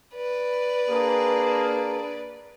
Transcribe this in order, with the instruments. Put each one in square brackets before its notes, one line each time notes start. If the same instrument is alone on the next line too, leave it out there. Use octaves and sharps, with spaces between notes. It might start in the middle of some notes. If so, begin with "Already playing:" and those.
[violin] B4 D5
[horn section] A#3 D4 G#4